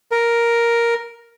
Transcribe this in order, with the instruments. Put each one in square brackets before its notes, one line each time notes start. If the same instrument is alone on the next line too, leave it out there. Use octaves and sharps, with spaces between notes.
[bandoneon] A#4